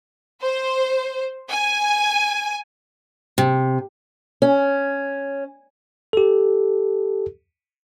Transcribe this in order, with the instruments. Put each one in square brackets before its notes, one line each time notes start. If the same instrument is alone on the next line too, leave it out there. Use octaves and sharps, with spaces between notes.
[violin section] C5
G#5
[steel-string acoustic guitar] C3
C#4
[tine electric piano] G4 A4